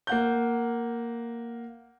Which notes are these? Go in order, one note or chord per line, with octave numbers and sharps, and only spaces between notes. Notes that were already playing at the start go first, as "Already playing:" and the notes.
A#3 F#5 G6